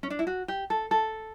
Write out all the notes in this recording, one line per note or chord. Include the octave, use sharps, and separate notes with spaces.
C#4
D4
E4
F#4
G4
A4
A4